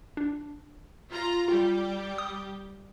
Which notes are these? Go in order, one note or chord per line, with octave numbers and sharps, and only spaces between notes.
D4
F4 A#5
G3 F4 G4
D#6